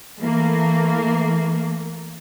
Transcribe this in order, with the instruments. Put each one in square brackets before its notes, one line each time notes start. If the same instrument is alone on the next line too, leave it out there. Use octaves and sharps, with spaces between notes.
[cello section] E3 A3 A#3